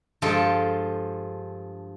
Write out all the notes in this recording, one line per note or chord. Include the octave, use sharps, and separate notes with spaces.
G2 F3 G#3 F4 A4 G5